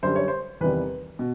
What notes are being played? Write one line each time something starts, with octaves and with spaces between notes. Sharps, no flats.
F#2 D3 G3 C5
C#5
C5
E2 C3 D#3 G3 B4
B2